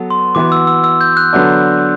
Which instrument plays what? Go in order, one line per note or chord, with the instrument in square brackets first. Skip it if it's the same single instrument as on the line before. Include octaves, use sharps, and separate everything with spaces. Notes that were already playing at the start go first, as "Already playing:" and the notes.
Already playing: [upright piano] F#3 B3 A4
[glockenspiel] C6
[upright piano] E3 B3 F#4 [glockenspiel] D6
[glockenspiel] E6
E6
E6
G6
F#6
[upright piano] D3 F#3 B3 D4